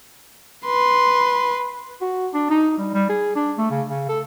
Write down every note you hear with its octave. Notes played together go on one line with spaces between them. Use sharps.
B4 C6
F#4
D4
D#4
G3
G3
G#4
D4
A3
C#3
C#3
A4